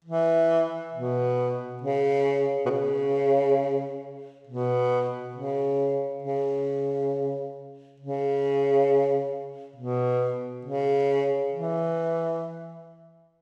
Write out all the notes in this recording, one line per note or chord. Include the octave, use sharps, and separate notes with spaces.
E3
B2
C#3
B2
C#3
B2
C#3
C#3
C#3
B2
C#3
E3